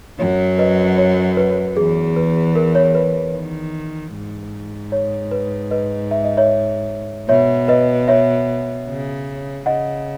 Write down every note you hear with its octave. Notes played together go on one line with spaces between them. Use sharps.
F#2 F#3 C#5
B4 D#5
C#5
B4
E2 E3 G#4
B4
A#4
C#5
B4
D#3
G#2
C#5
B4
B4 D#5
E5
D#5
C#5 E5
B2 C#5 E5
B4 D#5
C#5 E5
C#3
C#3 D#5 F#5